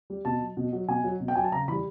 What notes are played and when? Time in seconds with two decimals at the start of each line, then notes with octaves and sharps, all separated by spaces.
0.10 G3
0.25 B2 A5
0.41 F#3
0.57 B2
0.73 F#3
0.88 B2 G#5
1.04 F#3
1.20 B2
1.28 G5
1.35 F#3 G#5
1.44 A5
1.52 C#3 A#5
1.68 E3 B5
1.72 G3